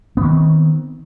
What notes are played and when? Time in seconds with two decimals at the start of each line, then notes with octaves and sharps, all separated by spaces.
0.17 B3
0.21 D#3
0.25 C4